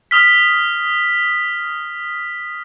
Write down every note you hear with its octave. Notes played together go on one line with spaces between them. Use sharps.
D#6 F6 B6